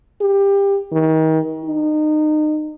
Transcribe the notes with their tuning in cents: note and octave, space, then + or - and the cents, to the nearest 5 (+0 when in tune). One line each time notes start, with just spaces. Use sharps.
G4 +20
D#3 +35
D#4 -30